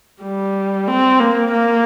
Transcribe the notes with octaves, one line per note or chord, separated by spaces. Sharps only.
G3
C4
A#3
A#3